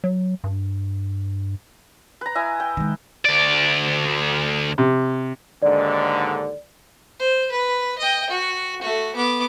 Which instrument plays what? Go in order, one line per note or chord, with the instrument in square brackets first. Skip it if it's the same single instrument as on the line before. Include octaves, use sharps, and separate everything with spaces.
[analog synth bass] F#3
G2
[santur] B4 A#5
E4 D#5 G#5
G5
[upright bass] D#3 G#3
[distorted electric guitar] D2 D5
[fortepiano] C3
[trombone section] D#2 G#2 D3 [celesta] D5
[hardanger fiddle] C5
B4
D#5 G5
F#4
A3 F#4
B3 D6